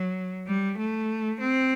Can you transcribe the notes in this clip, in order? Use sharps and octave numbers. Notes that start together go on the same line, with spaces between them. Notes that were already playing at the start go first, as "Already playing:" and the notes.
Already playing: F#3
G3
A3
C4